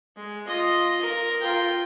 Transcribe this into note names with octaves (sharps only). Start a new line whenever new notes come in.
G#3
F4 D#5
A#4
F4 G5